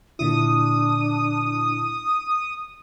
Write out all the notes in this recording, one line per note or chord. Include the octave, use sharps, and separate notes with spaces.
A#2 D3 D4 E4 D#6